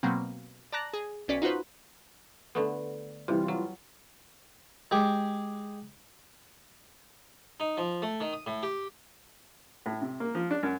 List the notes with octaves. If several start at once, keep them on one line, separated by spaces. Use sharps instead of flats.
B2 F#3 A#3 C4
D5 A5 A#5 F#6 A#6
G#4
B1 C#4 D5 B6
D#4 F4 F#4 B4 C5
D3 A3 B3
C3 E3 G3 F4
F#3
G#3 G4 G#4 G5
D#4
F3
A3
D#3
D#6
A2
G4
A2
C3
A#3
F3
D4
F#2